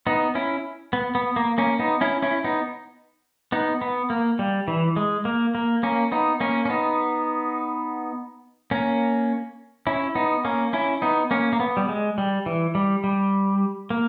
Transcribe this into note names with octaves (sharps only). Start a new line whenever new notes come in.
B3 D#4
C#4 E4
B3
B3
A#3
A#3 C#4
B3 D#4
C#4 E4
C#4 E4
B3 D#4
B3 D#4
B3
A#3
G3
E3
G#3
A#3
A#3
A#3 C#4
B3 D#4
A#3 C#4
C#4
B3 D#4
A#3 C#4
C#4 E4
B3 D#4
A#3 C#4
C#4 E4
B3 D#4
A#3 C#4
A#3
B3
G3
G#3
G3
E3
G3
G3
A#3